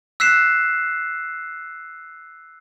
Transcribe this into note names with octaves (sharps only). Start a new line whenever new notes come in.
E6 F#6 B6 C7 E7